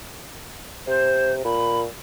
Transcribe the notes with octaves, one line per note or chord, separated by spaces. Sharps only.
C3 C5
A#2 B5